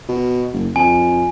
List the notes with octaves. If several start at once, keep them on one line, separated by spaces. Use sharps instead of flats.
B2
F#1
F2 G#5